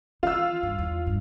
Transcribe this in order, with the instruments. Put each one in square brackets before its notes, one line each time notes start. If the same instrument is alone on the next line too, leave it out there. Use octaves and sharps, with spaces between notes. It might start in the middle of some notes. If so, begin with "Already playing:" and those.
[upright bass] E3 [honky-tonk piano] F4 E6
[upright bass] G2
E2
G2